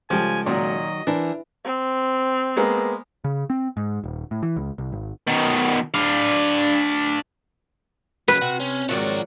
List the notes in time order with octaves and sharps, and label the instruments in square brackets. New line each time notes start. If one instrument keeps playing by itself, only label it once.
[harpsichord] C#2 A4 G5 [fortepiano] F3 G3 [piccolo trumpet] G#5
[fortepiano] A#2 [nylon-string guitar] D#3 F#3 F#4 [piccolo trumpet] D#5
[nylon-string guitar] E3 [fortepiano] D4 [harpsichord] A#4 C5
[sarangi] C4
[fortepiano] G#3 A#3 B3
[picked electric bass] C#3
C4
G#2
D#1
A2
E3
C#2
C2
G#1
[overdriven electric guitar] B2 D#3
D4 F5
[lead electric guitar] C#3 F#3 [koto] B4
[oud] C3 [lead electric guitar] F#4
[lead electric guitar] C#4
[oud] G#2 D#3 F#3 [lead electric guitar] F3 D5